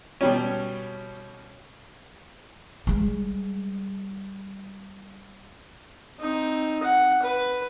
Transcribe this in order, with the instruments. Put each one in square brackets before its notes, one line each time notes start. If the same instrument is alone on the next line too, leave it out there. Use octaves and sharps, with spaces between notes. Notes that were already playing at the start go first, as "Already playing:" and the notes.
[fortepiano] B2 G3 C#4
[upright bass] G3 G#3
[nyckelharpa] C4 D#4
F#5
B4